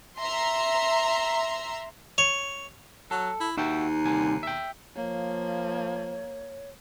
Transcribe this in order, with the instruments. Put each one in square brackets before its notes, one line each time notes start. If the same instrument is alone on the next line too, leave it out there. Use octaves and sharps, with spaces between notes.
[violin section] E5 A#5 C6
[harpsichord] C#5
[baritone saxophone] F#3 [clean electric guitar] A4
[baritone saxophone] E4
[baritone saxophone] D#2 [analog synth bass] D#4 [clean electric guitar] F#4 E5 G5
[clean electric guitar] C2 D3 G#5
E5 G5
[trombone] F3 [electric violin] A#3 [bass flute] C#5